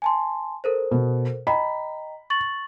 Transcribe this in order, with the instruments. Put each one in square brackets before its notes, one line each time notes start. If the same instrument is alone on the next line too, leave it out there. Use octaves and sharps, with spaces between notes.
[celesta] G#5 A5 C6
A4 A#4 C5
[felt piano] B2
[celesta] D#5 G5 A#5 [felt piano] B5
[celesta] C#6 A6 F#7